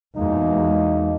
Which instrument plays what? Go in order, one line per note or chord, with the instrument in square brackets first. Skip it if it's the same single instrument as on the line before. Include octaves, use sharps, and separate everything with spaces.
[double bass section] E2 G#3 [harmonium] B2 A#3 [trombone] D#4